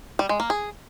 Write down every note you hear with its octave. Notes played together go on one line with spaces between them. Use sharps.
G3
G#3
A#3
G#4